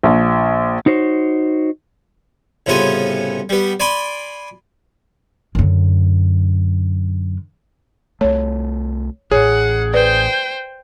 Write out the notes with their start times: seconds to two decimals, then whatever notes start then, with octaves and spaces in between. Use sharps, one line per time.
0.03 A#1
0.86 D#4 F#4 C5 C#5
2.66 C2 A2 C#3 B3 F4 G#5
3.49 G3 B3
3.80 D5 G#5 B5 C6 D6
5.55 F#2 D3
8.21 C2 A3 C#5
9.31 A1 A2 G#4 C#5 F#5
9.93 B4 C5 D5 G5